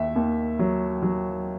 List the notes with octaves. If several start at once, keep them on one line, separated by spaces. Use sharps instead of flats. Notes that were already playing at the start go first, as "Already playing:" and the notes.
Already playing: D#2 D#3 E5
D#2
F#3
F#3